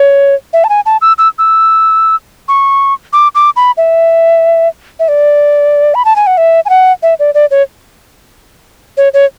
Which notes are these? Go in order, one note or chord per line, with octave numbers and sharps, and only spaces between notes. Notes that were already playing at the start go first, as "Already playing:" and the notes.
Already playing: C#5
E5
A5
G#5
A5
E6
E6
E6
C#6
D6
D6
B5
E5
E5
D5
B5
A5
G#5
F#5
E5
G#5
F#5
E5
D5
D5
C#5
C#5
C#5